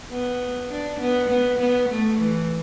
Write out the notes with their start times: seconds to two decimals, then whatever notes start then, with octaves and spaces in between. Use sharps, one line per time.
0.11 B3
0.71 D4
1.00 B3
1.30 B3
1.59 B3
1.89 A3
2.18 E3